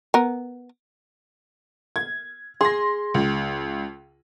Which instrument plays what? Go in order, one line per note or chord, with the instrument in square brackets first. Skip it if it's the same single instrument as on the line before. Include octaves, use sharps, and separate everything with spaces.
[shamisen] B3 A#4
[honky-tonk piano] G#6
[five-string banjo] G#4 [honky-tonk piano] C6 A#6
[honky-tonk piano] C#2